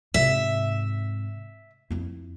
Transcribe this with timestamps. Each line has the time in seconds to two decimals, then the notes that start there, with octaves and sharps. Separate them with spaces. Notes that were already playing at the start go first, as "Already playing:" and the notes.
0.14 G#2 C3 E5
1.91 F2 E4